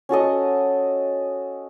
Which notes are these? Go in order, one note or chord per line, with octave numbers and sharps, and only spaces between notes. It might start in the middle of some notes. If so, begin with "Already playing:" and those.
C#4 F#4 A4 D#5